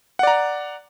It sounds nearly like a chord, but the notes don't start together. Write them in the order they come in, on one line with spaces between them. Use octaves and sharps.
F#5 D5 A#5